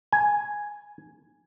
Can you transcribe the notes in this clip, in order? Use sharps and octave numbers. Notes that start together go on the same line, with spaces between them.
G#5